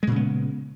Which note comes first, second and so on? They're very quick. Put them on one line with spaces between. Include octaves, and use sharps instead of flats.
G#3 A#2 C#3 B3